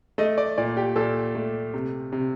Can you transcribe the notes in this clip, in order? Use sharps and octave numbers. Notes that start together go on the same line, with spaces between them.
A3 D#5
D5
A#2 D5
G4
A#2 A4
A3
C3
C3